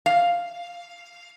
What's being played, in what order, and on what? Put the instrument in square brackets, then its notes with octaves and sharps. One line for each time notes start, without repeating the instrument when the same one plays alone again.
[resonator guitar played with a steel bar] F5